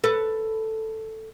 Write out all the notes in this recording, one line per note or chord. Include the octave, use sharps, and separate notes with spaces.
A4 B4